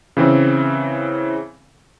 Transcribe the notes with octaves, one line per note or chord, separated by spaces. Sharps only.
C#3 E3 C4